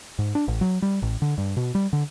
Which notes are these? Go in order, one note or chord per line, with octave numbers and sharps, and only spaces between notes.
G#2
D4
A1
F#3
G3
A1
D3
G2
B2
G3
D3